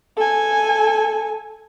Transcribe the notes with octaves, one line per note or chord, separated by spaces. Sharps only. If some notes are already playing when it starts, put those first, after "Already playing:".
A4 G#5